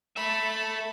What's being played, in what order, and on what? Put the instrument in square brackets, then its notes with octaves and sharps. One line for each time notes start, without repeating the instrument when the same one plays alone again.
[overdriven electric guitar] A4 E5 [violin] A5 B5